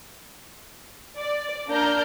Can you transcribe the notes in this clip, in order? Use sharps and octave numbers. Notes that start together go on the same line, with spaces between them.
D5
A#3 D4 D5 A#5 F6 G6